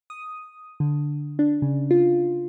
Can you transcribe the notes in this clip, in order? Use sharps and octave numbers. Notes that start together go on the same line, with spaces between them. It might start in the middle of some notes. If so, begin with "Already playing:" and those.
D#6
D3
D4
C#3
F4